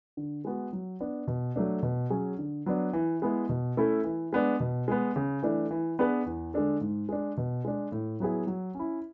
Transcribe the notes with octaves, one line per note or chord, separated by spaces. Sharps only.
D3
G#3 B3 F#4
F#3
B3 D4
B2
F#3 A3 D4
B2
F#3 C#4 G#4
D3
F#3 B3 D4
E3
G#3 B3 E4
B2
A3 C#4 E4 A4
E3
G#3 B3 D4
B2
G#3 B3
C#3
E3 A3 D4
E3
B3 D4 G#4 B4
E2
D3 G#3 D4 A4
G#2
G#3 D4
B2
G#3 D4
A2
F#3 B3 E4 G#4
F#3
C#4 E4